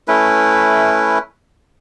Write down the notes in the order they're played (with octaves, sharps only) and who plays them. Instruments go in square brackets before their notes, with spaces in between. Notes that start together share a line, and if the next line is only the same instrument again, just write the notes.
[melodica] A3 C#4 E4 B4